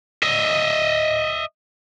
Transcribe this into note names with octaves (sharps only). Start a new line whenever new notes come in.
D#5 E5